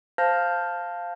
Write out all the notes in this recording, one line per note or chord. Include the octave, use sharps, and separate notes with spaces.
C5 F5 A5 F6 G6 A#6